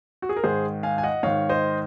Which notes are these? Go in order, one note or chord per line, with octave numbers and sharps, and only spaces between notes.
F#4
G#4
A#4
G#2 D#3 G#4 C5
F5 G#5
G#5
D#5 F#5
G#2 D#3 C#5 F5
C5 D#5